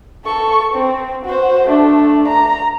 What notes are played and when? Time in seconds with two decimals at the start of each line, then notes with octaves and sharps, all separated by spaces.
0.25 A4 C#6
0.74 C4
1.25 F#4 C5
1.67 A3 D4
2.28 A#5